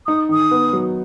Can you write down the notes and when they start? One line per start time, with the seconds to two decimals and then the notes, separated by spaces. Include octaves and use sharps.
0.07 D#4 D#6
0.29 D#3 D#6
0.51 B3
0.73 F#3